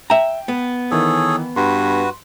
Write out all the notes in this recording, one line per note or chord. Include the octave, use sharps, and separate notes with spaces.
E5 G5 A#5
B3
D#3 E3 G#4 A4 B4 C#5
G2 F#4 B4 C6